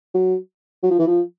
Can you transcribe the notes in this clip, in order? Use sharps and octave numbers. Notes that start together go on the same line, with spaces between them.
F#3
F#3
F3
E3
F3